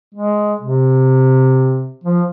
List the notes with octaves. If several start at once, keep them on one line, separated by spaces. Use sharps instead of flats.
G#3
C3
F3